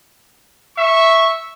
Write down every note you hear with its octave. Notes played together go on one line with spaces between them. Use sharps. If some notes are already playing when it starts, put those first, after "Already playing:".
E5 C#6